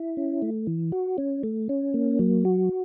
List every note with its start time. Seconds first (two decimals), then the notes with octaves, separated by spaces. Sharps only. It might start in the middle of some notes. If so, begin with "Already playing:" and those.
Already playing: E4
0.17 C#4
0.42 A3
0.67 E3
0.92 F#4
1.18 C#4
1.43 A3
1.69 C#4
1.94 A#3
2.19 F#3
2.45 F#4